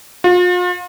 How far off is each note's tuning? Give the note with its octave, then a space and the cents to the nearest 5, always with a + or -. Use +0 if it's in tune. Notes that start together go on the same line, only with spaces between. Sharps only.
F4 +40